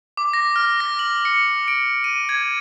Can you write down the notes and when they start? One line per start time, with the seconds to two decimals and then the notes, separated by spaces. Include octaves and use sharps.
0.17 D6
0.33 A#6
0.56 F6
0.80 A#6
0.99 F#7
1.25 C#7
1.68 D7
2.04 D#7
2.29 G#6